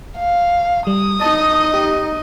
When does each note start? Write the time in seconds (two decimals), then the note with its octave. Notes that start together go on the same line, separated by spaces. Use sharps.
0.18 F5
0.87 G3 D#6
1.21 D#4 D#5 A5
1.74 G4